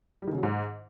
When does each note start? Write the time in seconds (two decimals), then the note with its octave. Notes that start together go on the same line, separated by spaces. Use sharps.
0.22 G3
0.27 D#3
0.33 C#3
0.38 F#3
0.43 G#2